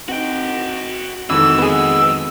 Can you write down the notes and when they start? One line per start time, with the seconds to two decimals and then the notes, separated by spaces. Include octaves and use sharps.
0.08 C4 D#4 F#4 G5
1.30 F2 D#3 E3 G#3 F#4 A4 E6
1.58 B3 G#4